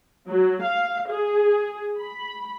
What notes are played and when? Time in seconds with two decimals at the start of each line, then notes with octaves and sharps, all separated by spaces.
0.28 F#3
0.61 F5
1.07 G#4
1.99 B5